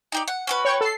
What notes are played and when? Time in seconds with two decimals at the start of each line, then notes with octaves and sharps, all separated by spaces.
0.12 D#4 G4 D5
0.28 F#5
0.47 C#4 F#4 B4
0.65 C#5 G5 C#6
0.81 A4 C7